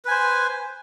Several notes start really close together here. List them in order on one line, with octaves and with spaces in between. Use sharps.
B4 G#5 C5